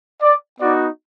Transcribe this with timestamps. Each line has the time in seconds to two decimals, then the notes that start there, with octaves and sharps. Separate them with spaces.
0.22 D5
0.60 B3 D#4 F#4 D5